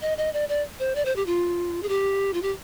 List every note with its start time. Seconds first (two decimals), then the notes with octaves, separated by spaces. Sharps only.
0.02 D#5
0.18 D#5
0.33 D5
0.49 D5
0.79 C5
0.95 D5
1.05 C5
1.16 G4
1.26 F4
1.83 G#4
1.89 G4
2.34 F4
2.42 G4